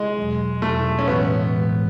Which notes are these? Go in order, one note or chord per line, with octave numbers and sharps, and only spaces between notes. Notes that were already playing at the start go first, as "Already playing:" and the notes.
Already playing: G#3
E2 B2 F#3
E2 B2 F#3 A3
C#4
A2 E3 G#3 B3
A2 E3 G#3